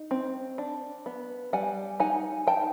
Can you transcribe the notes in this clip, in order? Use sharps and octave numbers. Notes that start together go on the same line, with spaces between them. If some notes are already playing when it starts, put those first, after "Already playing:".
Already playing: D#4
C4
D4
B3
G3 F#5 G#5
D#4 F#5 G#5
D#4 G5 A5